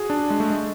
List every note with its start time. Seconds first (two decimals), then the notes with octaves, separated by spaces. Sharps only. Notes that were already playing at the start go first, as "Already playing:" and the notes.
Already playing: F#4 G#4
0.10 D4
0.30 G#3
0.40 A3
0.50 G#3